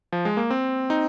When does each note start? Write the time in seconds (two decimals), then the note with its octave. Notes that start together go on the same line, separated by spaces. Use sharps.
0.12 F3
0.25 G#3
0.37 A#3
0.50 C4
0.90 D#4